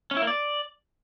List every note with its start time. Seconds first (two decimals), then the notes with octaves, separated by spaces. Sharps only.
0.11 C#4
0.17 E4
0.22 A#3
0.27 D5